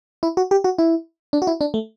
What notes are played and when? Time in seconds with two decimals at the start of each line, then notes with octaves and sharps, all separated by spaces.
0.23 E4
0.37 F#4
0.51 G4
0.64 F#4
0.78 E4
1.33 D4
1.42 F#4
1.47 E4
1.61 D4
1.74 A3